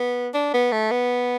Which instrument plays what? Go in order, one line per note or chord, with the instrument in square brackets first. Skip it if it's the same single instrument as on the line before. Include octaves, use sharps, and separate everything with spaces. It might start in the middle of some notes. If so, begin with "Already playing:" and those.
Already playing: [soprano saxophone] B3
D4
B3
A3
B3